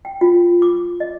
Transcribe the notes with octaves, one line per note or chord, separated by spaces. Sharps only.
G5
F4
D6
D#5